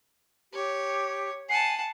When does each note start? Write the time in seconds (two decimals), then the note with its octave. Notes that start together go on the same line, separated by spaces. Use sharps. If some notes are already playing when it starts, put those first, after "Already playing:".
0.53 G4 C#5
1.49 F#5 G#5 A5 C7